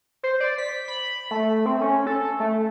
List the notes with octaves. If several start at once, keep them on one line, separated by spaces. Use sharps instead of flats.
C5
D5
B6
B5
A3
C4
C#4
A4
A3